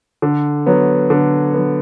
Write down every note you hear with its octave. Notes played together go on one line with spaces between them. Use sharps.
D3
F#3 B3
D3
F#3 B3